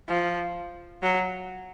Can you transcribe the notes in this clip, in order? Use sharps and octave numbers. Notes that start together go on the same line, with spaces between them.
F3
F#3